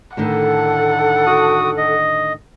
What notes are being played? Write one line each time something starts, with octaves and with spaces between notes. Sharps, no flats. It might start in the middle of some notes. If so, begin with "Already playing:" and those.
A2 D3 D#3 A4 F#5
F#4 D#6
D#5